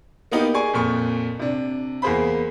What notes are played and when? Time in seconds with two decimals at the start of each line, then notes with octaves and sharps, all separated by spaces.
0.31 A#3 B3 D#4 G4
0.54 G#4 D5 G#5 C#6
0.73 F2 A#2 C#6
1.39 C3 D4
2.02 E2 A#3 G#4 C5 B5